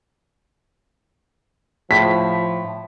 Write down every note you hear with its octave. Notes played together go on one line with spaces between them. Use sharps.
A2 F3 B6